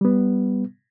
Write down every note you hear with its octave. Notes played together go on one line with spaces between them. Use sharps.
G3 B3